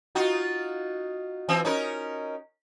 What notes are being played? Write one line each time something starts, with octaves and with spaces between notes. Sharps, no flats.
D#4 F4 F#4
E3 C4
C#4 D#4 A#4